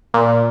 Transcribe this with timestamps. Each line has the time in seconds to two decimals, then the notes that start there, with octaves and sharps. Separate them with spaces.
0.14 A#2